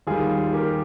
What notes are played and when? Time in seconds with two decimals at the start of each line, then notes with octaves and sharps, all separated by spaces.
0.07 D#2 D#3 G3 F4 G#4
0.53 G4 A#4